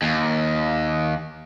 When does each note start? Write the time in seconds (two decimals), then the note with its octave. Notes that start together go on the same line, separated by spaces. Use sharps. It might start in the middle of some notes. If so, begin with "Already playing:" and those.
0.02 D#2